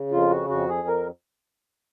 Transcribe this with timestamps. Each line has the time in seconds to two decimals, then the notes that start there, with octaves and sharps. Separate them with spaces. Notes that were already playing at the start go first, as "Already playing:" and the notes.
Already playing: C#3
0.11 F2 F4
0.30 F#4
0.49 F2 F#4
0.69 G#4
0.88 A#4